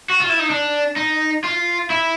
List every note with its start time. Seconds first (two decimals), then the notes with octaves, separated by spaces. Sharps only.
0.10 F#4
0.20 F4
0.29 E4
0.39 D#4
0.50 D4
0.96 D#4
1.44 F4
1.90 E4